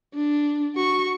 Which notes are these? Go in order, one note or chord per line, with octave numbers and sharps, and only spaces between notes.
D4
F#4 C#6